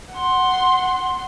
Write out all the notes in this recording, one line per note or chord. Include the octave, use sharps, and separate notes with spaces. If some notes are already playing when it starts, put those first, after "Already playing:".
F#5 C6